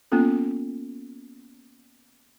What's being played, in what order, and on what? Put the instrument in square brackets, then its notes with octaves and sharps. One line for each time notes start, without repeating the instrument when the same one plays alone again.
[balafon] A#3 B3 C#4 F4 A4